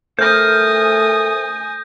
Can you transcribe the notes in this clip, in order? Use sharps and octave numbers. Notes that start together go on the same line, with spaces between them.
A3 A#4 C5 G#5 D#6 G6 A#6